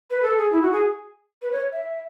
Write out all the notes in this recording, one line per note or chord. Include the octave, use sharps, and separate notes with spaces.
B4
A4
G#4
E4
F#4
G#4
B4
C#5
E5